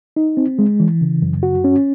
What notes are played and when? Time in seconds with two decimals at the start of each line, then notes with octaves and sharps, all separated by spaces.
0.16 D#4
0.37 C4
0.59 G#3
0.80 E3
1.01 C#3
1.22 F#2
1.43 F#4
1.64 C#4